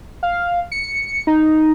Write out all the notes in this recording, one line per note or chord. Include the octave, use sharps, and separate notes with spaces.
F5
C#7
D#4